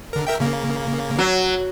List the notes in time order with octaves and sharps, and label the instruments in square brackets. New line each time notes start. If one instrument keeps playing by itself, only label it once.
[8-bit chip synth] D3 A#4
A#4 E5 G5
C#3 A#3
[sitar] F#3